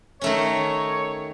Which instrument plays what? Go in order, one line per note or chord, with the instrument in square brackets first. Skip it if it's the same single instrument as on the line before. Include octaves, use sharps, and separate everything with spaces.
[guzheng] D#3 A3 C#4 [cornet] C#5